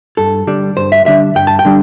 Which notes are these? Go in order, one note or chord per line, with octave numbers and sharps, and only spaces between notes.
G2 A4
D3 G3 D4
G2 C5
E5
D3 G3 D4 E5
G2 G5
A5
G5
D3 G3 D4